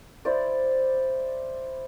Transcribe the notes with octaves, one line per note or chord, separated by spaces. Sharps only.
E4 C5 D5